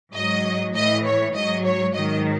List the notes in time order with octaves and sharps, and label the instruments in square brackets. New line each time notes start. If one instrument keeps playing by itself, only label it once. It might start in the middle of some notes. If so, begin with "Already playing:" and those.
[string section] G#2 F#3 D#5
A2 E3 D#5
C#5
G#2 F#3 D#5
C#5
G#2 D#3 F#3 D#5